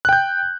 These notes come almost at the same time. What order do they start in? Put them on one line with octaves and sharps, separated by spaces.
F#6 G5 G6